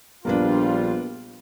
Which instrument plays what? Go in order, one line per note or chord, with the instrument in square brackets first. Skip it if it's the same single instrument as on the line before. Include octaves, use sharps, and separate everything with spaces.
[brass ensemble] A#1 G3 F4 [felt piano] A#3 B3 D4